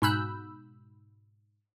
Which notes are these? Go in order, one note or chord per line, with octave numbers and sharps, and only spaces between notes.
G#2 B2 B5 E6 F#6 G6